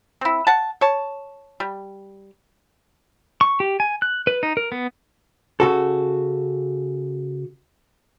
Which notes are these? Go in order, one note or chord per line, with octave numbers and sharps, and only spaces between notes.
C4 E4
F#5 A5
C#5 A5
G3
C#6
G4
G#5
F#6
B4
D#4
A#4
B3
C#3 F#4 A4